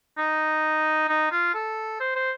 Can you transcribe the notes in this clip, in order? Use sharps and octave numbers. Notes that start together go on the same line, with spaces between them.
D#4
D#4
F4
A4
C5
C5